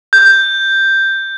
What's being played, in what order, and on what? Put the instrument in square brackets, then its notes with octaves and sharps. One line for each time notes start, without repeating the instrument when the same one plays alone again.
[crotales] G6